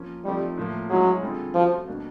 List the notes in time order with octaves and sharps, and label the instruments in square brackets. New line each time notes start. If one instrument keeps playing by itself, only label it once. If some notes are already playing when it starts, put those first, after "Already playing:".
Already playing: [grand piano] F3 A#3 C#4
[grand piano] F3 A3 C4 D#4 [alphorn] G3
[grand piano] A2 F3 A#3
[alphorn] F#3 [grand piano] G#3 C#4 E4 G#4
[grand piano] D3 G3 C4 F4 G#4
[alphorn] F3 [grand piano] A3 C#4 F#4
[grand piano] B2 G3 A#3 D4